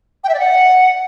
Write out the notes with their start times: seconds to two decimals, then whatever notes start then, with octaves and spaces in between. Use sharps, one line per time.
0.24 G5
0.29 E5
0.34 D5
0.39 F#5